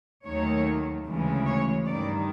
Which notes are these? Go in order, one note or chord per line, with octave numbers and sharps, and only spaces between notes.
D#2 D#3 F#3 A3 C#5
D2 C#3 E3 G#3
C#5
G2 D#3 G3 D5